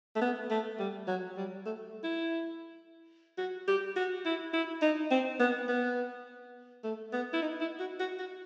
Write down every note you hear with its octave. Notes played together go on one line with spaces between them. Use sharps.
A3
B3
A3
G3
F#3
G3
A3
E4
F#4
G4
F#4
E4
E4
D#4
C4
B3
B3
A3
B3
E4
D#4
E4
F#4
F#4
F#4